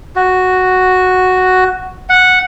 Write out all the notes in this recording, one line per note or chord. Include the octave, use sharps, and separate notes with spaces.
F#4
F#5